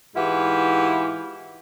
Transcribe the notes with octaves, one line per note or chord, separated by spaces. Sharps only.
G#2 E3 E4 F4 G4 F#5